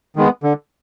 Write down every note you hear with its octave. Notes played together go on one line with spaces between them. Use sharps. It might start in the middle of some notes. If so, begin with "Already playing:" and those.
D#3 G#3 B3
D3